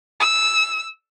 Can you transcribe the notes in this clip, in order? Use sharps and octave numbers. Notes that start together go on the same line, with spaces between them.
E6